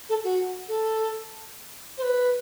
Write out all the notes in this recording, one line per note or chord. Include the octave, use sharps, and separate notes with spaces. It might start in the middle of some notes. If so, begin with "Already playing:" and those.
A4
F#4
A4
C5
B4